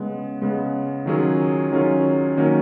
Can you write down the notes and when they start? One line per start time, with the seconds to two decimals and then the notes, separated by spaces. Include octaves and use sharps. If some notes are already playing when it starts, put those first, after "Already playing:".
Already playing: C#3 G#3 B3
0.41 C#3 G#3 B3
1.06 D#3 F#3 C#4 F4 G#4
1.71 D#3 F#3 C#4 F4 G#4
2.37 D#3 F#3 A#3 C#4